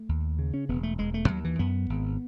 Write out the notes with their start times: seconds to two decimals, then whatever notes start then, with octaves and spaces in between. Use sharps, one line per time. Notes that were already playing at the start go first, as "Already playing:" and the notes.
Already playing: A3
0.09 D#2
0.39 C#3
0.54 C#4
0.69 E1 B3
0.83 A3
0.98 E1 G#3
1.14 A3
1.29 D#2 F#3
1.44 E3
1.59 F#2 B3
1.90 G#1